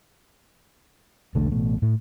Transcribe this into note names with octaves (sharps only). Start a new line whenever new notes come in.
E1 B1 D3 A3
A1 B2 A3
A2